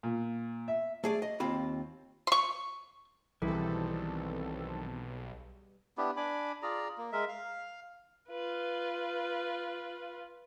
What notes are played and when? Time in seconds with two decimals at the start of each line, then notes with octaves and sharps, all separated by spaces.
0.03 A#2
0.68 E5
1.04 A3 G#4 D5
1.22 D#5
1.40 D#2 C4 F4 B5
2.27 C6 C#6
3.42 B1 D#3 E3 G3 C4 G#4 A4 B4
5.98 B3 D4 E4 G4
6.17 D4 G#5 B5 D6
6.62 F4 G#4 D5 A#5
6.98 A#3
7.12 G#3 A#4 E5
7.28 F5
8.29 F4 B4